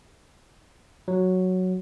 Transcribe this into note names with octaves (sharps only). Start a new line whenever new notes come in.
F#3